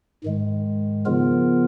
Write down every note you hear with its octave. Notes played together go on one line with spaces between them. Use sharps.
G#2 D#3 G#3
C#3 F3 B3 F4 A#4